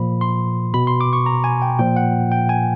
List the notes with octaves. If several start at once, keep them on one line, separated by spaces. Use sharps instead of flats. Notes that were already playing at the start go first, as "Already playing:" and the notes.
Already playing: A#2 F3 B5
C6
B2 B5
C6
D6
C#6
A#5
G#5
G5
A#2 F3 G5
F#5
G5
G#5